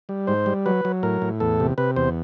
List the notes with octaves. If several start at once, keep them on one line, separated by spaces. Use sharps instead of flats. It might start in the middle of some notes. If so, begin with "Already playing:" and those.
G3
G#2 C5
G3
F#3 B4
F#3
A2 A#4
A2
E2 A4
C3
C3 B4
E2 C5